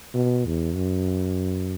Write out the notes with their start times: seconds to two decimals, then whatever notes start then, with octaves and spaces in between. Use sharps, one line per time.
0.14 B2
0.46 E2
0.75 F#2